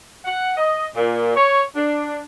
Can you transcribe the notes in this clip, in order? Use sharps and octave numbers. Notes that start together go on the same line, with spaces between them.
F#5
D#5
A#2
C#5
D4